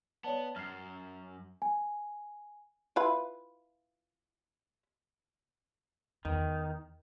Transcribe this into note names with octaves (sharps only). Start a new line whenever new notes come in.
B3 C#5 D5 A5
F#2 F6 C7
G#5
E4 F4 B4
E2 D#3